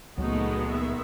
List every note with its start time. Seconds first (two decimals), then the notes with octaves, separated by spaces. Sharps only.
0.18 C#2 A#2 F#3 G#3 A3 B3 D#4 F#4
0.71 D#3 E5